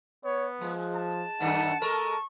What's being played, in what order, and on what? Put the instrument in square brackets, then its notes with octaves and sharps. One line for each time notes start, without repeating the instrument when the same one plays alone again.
[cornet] B3 [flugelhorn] C#5
[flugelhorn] F3 [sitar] G#3
[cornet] A5
[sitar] F#2 D#3 A3 [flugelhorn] D#4 [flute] F#5
[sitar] G#3 A#4 [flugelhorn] A4 [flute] C#6